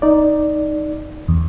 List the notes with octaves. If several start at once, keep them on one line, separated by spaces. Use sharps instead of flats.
D#4 D5
E2